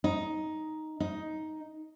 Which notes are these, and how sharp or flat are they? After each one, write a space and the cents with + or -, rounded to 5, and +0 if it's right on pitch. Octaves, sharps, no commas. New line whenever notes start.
D#4 +5
D#4 +5